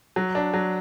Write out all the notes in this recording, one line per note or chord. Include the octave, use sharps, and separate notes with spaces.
F#3
D4
F#3